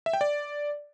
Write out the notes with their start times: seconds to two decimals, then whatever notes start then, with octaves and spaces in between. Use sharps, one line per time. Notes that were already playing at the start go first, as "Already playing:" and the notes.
0.06 E5
0.13 G5
0.21 D5